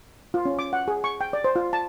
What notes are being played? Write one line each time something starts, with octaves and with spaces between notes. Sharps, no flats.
F4
C#4
D6
F#5
G#4
C#6
G5
D5
C5
F4
A5